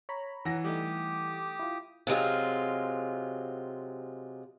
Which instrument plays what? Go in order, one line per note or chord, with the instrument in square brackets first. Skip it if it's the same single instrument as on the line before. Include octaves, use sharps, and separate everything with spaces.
[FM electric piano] C#5 A#5 B5
[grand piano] E3 F#5 A#6
[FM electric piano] G3 A3 D#4 [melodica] G4 D6 D#6
[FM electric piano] E4 F4
[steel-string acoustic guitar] C3 F#3 G#3 F4